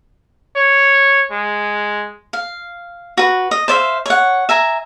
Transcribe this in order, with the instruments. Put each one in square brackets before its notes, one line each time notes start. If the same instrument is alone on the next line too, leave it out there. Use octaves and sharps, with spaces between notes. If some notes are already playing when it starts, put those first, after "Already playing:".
[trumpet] C#5
G#3
[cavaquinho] F5
F#4 B4
D#5
C5 D5 E5 F5
C#5 F#5
E5 G#5 A#5